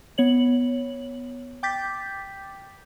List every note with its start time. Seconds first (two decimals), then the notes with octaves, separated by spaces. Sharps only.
0.18 B3 C#5 F#7
1.63 G5 D6 G6 A6 B6